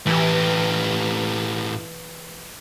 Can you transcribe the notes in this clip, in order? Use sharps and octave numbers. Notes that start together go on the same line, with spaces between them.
A2 E3 G4